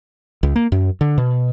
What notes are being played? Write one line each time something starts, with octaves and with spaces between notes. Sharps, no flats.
C#2
A#3
F#2
D3
B2